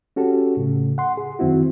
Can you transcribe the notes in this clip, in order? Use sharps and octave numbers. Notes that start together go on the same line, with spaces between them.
C#4 F#4 G4 A4
A2 C#3
F#5 C6
G#4
F#2 D#3 C4 E4 F#4